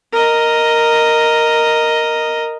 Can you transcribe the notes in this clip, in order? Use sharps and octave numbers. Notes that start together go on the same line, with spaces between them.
A#4 D#5